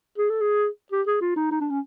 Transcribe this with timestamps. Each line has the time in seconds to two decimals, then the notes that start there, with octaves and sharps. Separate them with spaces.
0.18 G#4
0.29 A4
0.41 G#4
0.92 G4
1.07 G#4
1.21 F4
1.36 D#4
1.51 D#4
1.61 D4
1.70 C#4